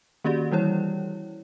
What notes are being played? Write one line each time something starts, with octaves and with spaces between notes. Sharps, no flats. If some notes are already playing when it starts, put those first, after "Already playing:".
D#3 A#3 C#4 F#4 G4 D5
E3 G3 E4 C#5